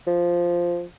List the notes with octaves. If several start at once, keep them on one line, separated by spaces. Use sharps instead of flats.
F3